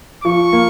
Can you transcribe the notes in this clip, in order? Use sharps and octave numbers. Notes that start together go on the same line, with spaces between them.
F3 C#6
A#3